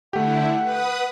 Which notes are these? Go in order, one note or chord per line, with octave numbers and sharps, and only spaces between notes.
D3 A3 E4 G4 F#5
B4 D#6